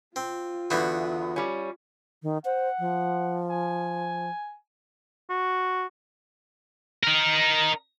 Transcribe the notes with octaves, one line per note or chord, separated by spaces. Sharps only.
C4 F4
E2 D3 B3 F#4
G3 C#4
D#3
C5 F#5
F3
G#5
F#4
D#4 A#4